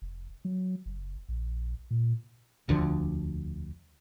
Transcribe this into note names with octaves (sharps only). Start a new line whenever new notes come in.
F1
F#3
F#1
A#1
A#2
E1 D2 D3 F3